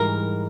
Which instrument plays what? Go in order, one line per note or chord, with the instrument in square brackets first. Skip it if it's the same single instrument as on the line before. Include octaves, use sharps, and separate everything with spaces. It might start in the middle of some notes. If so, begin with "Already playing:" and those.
Already playing: [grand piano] G#2 E3 G3 [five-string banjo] A#4